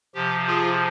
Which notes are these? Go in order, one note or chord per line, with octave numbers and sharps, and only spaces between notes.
C3 F3 G4
F4 G#4